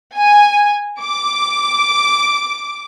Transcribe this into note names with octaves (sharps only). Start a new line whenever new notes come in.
G#5
D6